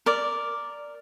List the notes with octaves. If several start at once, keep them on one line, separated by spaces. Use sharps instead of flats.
A#4 D5